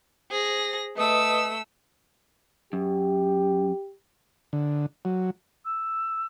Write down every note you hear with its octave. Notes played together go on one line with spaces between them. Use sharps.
G#4 C5 A#6
A3 B4 D#5 D#6 E6
F#2 G4
D3
F#3
E6